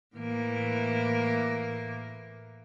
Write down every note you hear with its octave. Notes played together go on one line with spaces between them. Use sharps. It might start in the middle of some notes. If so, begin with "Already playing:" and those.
A2 E3 A#3